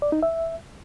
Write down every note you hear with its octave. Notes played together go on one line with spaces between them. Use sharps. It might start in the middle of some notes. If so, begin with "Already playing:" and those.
D5
D#4
E5